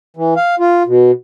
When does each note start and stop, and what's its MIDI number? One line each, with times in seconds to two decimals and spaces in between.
0.17 0.34 52
0.37 0.55 77
0.60 0.83 65
0.87 1.11 47